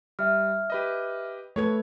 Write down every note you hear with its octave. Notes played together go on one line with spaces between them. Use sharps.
G3 E5 F6
G4 B4 D#5
A3 A4 B4 C#5 G#6